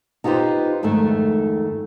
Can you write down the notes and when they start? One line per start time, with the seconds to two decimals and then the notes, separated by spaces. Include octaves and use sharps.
0.24 D#4 F4 G4 A4 B4 C5
0.83 F2 G#2 D#3 A3 E4